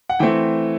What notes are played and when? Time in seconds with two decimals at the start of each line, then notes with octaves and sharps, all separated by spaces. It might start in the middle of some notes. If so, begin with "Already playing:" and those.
0.10 F#5
0.19 E3 A3 C4 G5